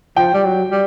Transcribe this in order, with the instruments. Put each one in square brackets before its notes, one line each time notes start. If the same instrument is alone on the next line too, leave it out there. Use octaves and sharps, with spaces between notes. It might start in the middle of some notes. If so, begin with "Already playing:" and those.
[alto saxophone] F3 [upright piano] G5
[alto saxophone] G3
F#3
G3